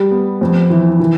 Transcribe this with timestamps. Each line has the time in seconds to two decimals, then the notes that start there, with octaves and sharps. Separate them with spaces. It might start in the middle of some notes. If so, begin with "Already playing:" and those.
Already playing: G3
0.11 B3
0.41 F2
0.70 E3
1.00 E3